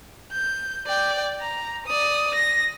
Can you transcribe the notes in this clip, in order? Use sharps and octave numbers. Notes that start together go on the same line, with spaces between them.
G6
D5 G5
A#5
D5 D#6
A#6